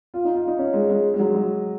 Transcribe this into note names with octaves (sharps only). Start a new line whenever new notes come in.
F4
D#4
F4
D#4
C#4
G#3
G#3
G#3
F#3
F#3